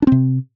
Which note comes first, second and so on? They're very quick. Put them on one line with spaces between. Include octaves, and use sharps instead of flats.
D4 C4 C3